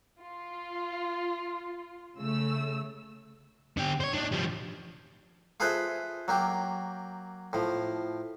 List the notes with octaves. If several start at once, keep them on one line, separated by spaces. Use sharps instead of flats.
F4
C#3 A3 E6
D3 G4
C5 C#5
D4 D#4
F3 G3
F4 G#4 A4 B4 C5 E5
F#3 A#3 G4
A2 F3